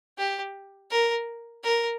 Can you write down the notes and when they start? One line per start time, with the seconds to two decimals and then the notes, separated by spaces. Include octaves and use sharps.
0.18 G4
0.91 A#4
1.63 A#4